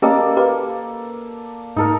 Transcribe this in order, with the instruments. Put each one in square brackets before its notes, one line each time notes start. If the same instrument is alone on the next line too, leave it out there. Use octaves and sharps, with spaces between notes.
[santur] A#3 A4 D5 [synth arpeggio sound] C#4 G4 D#5
[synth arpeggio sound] G4 B4 F5
[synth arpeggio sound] G#2 [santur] D#4 A4 A#4